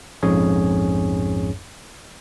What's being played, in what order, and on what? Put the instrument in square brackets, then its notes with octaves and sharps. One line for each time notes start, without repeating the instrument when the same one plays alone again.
[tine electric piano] A#1 F2 G#2 C#4 G#4 C#5